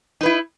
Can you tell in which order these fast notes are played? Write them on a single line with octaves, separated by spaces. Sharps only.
D#4 B4 E4